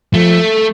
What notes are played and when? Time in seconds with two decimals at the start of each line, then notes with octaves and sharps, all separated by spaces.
0.14 F3 A3